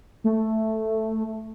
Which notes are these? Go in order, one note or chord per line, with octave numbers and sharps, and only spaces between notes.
A3